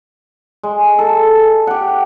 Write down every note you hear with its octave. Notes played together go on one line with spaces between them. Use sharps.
G#3
A4
G4 F#5